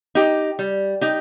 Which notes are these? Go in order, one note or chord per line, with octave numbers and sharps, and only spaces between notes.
D#4 G4
G3
D#4 G4